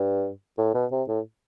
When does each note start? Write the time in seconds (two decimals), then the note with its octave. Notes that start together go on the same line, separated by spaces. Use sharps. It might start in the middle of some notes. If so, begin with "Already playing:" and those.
Already playing: G2
0.58 A2
0.74 B2
0.92 C3
1.08 A2